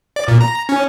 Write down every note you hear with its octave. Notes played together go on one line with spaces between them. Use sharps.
D5
A#2
A#5
C#4